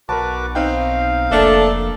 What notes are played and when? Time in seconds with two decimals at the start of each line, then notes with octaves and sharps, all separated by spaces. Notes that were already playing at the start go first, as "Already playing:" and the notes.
0.09 B1 F#4 A#4 B4 A5 D6
0.55 C4 D#4 F5 G5
1.32 F1 A3 A#3 D4 A4